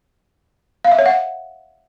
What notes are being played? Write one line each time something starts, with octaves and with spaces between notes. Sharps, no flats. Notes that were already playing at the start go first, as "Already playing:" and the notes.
F5
E5
C#5
F#5